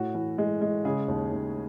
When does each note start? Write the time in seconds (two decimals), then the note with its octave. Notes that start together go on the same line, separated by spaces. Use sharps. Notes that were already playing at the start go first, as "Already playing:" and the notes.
Already playing: A2 F#4
0.15 E3
0.38 G#3
0.61 G#3
0.85 C#3 G#4
1.08 D#2
1.32 D#2